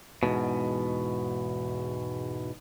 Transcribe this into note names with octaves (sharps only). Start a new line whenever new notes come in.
E2 G#2 B2